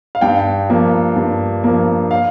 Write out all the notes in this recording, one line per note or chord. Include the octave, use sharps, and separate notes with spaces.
F5
G2 G5
F3 A#3
G2
F3 A#3
F5